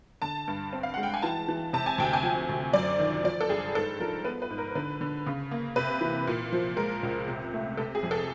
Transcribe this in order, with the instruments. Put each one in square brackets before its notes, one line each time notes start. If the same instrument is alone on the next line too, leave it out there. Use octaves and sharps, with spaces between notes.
[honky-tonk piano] D3 A5
G2
C4
F5
G#3 F#5
G5
G#5
E3 A5
E3
C3 A5
G#5
D2 G5
G#5
F3
D2
F#2 D5
D#3
F3 D5
A4
G2 G#4
G#2 A4
F3 A#4
B3 B4
B4
G#2
A#4
D3 B4
D3
C#3
A#3
C3 B4
E3
A#2
F3
G#3 A#4
C#2
C3
A3
C3 A4
G#4
F2
A4